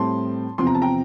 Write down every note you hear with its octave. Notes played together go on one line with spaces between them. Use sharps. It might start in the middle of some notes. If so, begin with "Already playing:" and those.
Already playing: A2 G3 C4 A5 C6
E2 C3 F3 C4 C6
A#5
A5
G5 A#5